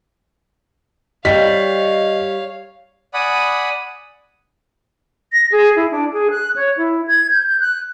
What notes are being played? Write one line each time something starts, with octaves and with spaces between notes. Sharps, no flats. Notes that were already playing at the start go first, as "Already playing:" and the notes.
G3 C#5 D#5 F5 B6
D5 F#5 G#5 B5 D#6
A#6
G#4
E4
D4
G#4
F#6
C#5
E4
G#6
G6
G6
F#6